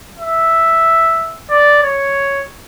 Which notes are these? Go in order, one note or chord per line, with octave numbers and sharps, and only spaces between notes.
E5
D5
C#5